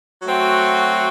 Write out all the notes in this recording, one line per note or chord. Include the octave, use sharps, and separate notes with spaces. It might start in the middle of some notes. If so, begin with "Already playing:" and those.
F#3 A3 C4 F#4